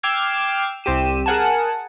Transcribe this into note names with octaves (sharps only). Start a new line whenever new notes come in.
G5 D6 E6 F6 G#6 C7
C2 C4 G4 D#7 E7
G#4 A#4 F#5 G#5 A5